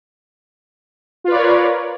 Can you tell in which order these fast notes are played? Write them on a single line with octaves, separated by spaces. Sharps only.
F4 B4 D5 C#5 A#4